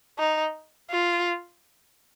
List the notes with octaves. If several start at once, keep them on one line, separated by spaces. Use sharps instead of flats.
D#4
F4